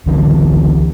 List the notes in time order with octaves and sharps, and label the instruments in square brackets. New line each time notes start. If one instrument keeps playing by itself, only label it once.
[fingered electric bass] C#2 D3 E3